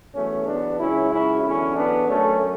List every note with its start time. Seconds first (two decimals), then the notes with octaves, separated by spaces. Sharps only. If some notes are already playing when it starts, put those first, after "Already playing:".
0.14 E2 B2 F#3 A3 C#4
0.47 B3 D4
0.79 C#2 C#3 F#3 C#4 E4
1.11 C#4 E4
1.43 E2 D3 F#3 C#4 E4
1.76 B3 D4
2.08 F#2 D3 F#3 A3 C#4